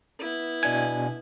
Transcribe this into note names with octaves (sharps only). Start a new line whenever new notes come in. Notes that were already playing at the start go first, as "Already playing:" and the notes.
B3 E4
B2 D4 G#5 G#6